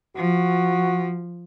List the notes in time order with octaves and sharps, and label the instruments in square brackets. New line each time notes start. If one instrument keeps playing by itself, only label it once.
[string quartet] F3 [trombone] F#4